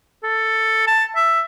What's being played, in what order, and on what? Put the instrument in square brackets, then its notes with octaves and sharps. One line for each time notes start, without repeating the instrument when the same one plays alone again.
[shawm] A4
A5
E5